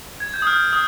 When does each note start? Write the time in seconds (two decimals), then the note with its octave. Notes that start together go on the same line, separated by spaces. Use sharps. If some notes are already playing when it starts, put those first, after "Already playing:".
0.20 G#6
0.34 G6
0.42 D#6
0.47 F6
0.73 D#6